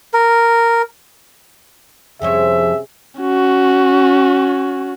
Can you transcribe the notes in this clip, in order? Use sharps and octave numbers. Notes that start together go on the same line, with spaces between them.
A#4
F2 C3 F3 C#4 G#4 C#5 E5
C#4 F#4